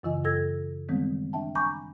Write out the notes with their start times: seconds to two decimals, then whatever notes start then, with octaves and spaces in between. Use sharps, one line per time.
0.03 F#2 C#3 E3 F4 D#5 G#5
0.24 F#2 A4 E6 G#6 A#6
0.89 D#3 E3 G3 G#3 B3 C4
1.33 D4 E5 G5 A5
1.55 G#5 A#5 B5 C#6 D6 G6